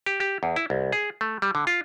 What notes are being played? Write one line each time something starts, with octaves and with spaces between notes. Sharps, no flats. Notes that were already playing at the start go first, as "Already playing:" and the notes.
G4
G4
E2
E4
C2
G#4
A3
G3
D3
F4